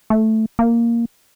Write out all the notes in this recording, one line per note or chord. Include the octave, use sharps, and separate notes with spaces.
A3
A#3